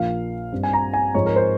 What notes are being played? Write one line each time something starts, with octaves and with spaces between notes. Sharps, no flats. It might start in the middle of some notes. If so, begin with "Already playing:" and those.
Already playing: A#1 A#2 F3 A#3 F5
G2 G3 C4
G#5
A#5
G#5
G#2 F3 G#3 C4 C#5
A#4
C5